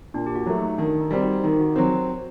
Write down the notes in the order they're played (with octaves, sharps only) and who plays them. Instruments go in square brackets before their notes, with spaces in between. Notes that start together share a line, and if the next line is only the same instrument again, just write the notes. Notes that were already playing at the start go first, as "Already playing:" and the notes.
[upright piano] A#2 [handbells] D4
[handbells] G4
F#4
[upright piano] F#3 A3
[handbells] D#4
[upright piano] D#3 [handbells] D4
[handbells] D#4
[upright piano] G3 C4 G4 [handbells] D#4
[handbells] F#4
[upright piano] D#3 [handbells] D#4
[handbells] G4
F#4
[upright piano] F#3 C4 [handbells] F#4